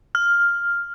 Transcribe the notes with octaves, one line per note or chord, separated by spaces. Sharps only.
F6